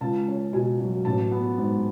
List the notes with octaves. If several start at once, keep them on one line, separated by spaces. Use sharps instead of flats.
C#2 A5
C#4
B2 G#5
F#3
A1 A5
B3
G#2